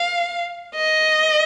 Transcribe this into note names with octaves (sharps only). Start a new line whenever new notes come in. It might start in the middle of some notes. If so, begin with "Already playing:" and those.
Already playing: F5
D#5